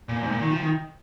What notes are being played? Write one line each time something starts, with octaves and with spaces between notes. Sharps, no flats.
A#2
G#2
A#2
D#3
F3
D#3